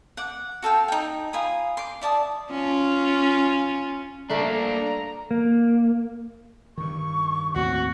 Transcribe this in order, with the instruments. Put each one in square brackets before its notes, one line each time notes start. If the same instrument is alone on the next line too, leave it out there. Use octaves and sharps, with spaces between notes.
[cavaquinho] F#5 D6
F#4 A4 F5 G5
D#4 G5
F4 G#5 B5 D#6
C6 D6
E4 D5 A5 D#6
[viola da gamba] C#4 F4
[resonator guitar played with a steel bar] G3 A3 A4 [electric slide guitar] A#3 D4 [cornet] A#5
[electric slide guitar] A#3
[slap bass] G2 D#3 [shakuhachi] C#6
[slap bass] D#2 A2 C4 [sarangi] F#4